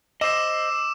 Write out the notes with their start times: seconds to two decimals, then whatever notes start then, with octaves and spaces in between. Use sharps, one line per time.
0.21 C5 D#5 D6 E6 E7